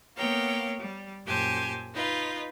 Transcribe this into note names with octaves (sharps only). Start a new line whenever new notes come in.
A#3 B3 C#5 F5 G5 A#5
G3
F#2 A#2 G4 C5 G#5 A5
D#4 F4 B4